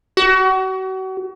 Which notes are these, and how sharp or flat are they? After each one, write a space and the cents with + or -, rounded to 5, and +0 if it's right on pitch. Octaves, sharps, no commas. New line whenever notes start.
F#4 +35